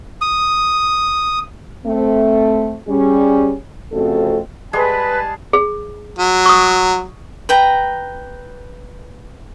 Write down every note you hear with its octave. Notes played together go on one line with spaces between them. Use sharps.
D#6
A3 C4
G3 C#4 G#4
F2 C#3 A3 C4 F#4 A4
G3 G#3 G#4 B4 A5
G#4
F#3
C#6 D#6
B4 G5 A#5